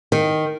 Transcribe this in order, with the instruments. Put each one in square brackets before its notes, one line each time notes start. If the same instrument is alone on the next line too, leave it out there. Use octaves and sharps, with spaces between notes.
[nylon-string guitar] D#3